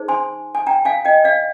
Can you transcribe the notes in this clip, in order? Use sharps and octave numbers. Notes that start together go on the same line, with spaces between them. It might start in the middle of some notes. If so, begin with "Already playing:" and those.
Already playing: D#4 G#4 C5
G#5 C6
G#5
G5 A#5
F5 G#5
D#5 G5
D5 F5